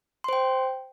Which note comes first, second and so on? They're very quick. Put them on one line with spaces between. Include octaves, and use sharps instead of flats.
C6 C5 G5